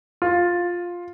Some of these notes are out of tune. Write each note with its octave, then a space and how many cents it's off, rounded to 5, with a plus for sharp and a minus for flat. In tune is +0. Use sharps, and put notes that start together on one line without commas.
F4 +5